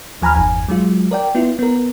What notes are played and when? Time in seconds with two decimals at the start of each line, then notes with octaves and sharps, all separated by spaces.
0.22 D#2 F3 G#5 A#5 B5 F6
0.35 G1 E2 G#5
0.69 F#3 G#3 F4
1.11 A#4 D5 G5
1.35 B3 E4 F4
1.59 B3 A#4